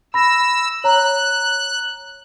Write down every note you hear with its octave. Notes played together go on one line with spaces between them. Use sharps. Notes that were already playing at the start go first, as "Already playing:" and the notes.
B5 E6 A#6
C#5 A#5 F#6